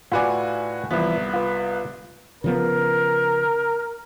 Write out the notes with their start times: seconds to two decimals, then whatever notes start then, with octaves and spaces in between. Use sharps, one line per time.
0.12 A2 F4 F#4 B4 D5 G#5
0.91 C2 E3 F3 B3 E4
1.34 F4 B4
2.44 C#3 F3 B3 A#4